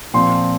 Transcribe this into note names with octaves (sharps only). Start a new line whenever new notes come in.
A#2 F3 C4 C6